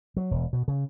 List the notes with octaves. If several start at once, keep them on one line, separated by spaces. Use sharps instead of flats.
F#3
E1
B2
C#3